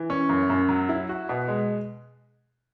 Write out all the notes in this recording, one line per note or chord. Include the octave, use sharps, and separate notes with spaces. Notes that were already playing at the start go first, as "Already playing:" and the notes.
Already playing: E3
C#4
F#2
F#2
F#3
E4
F#4
B2
G#3